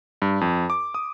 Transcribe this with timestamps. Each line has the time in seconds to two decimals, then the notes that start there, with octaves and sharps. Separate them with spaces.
0.22 G2
0.41 F2
0.70 D6
0.94 D#6